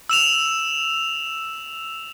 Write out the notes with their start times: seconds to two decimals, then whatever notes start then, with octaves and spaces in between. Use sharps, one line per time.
0.09 E6 E7 F7